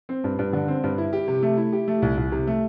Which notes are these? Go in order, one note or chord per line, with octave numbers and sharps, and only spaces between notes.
C4
G2
G2
D3
C4
G2
E4
G4
C3
A3
E4
G4
A3
C2
C2
C3
A3